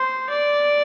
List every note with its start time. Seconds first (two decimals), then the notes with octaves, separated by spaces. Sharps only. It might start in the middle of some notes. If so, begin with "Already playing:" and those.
Already playing: C5
0.30 D5